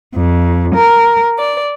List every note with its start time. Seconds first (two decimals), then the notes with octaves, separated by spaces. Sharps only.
0.16 F2
0.75 A#4
1.39 D5